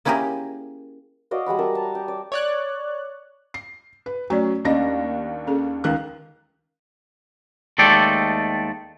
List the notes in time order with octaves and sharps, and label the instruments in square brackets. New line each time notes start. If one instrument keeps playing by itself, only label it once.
[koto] A#3 C#4 E4 G4 G#4 A#4
[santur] F#4 D5 D#5 F5
G3 G#3 F#5 B5
A#4 E5 A5
A5 A#5
G5
D5
[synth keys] C#5 D5 F#6
[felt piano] C7
B4
[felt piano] F#3 C#4 [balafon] A3 D5
[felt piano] D#2 D4 A#6 [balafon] C#4 D#5
[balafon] C#4 G#4 A4
[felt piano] C#2 D#3 F#6
[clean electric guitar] D#2 G#3 A3 A4 D5 G5